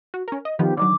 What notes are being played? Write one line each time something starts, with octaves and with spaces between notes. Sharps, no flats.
F#4
C#4 A#4
D#5
D#3 F3 B3 G4
D3 D#3 F#3 D6